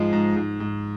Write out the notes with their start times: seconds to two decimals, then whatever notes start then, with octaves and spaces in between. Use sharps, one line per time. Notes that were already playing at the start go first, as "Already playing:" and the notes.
Already playing: G#2 F3 G#3
0.13 G#2
0.36 G#2
0.60 G#2